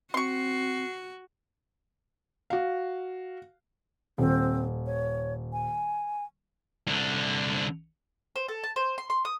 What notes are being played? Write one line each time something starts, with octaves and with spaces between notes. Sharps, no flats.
C4 F#4 C6 C#6 C7
F#4 F5
D#1 C4
C#5
G#5
C2 D3
C5
A4
A5
C5
C6
C6
D#6